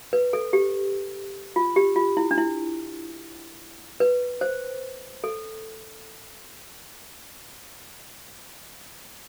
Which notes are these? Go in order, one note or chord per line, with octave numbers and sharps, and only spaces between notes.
B4
A4
G4
F4
G4
F4
E4
D4
E4
B4
C5
A4